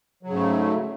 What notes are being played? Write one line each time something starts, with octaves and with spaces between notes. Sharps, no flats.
G#2 C#3 F#3 A3